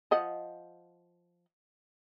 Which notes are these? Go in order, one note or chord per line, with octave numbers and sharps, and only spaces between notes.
F3 D#5 F#5